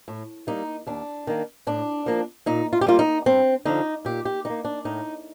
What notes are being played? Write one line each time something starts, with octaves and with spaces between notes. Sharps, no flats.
A2
G3 A#3 D#4
D#2 D4
D#3 A#3
A2 D4
F3 A#3
A#2 D#4
F4
G4
G3 A#3 F4
D#4
G2 C4
D3 F3 D#4
A#2 G4
G4
G3 A#3 D#4
D4
A2 D#4